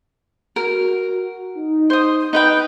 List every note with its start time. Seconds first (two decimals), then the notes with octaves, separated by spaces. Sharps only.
0.56 F#4 A#4
1.55 D#4
1.90 C5 D#6
2.33 D#4 B4 G5 D#6